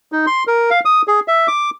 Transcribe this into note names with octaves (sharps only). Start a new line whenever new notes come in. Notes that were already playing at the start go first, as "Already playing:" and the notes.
D#4
C6
A#4
F5
D#6
G#4
E5
D6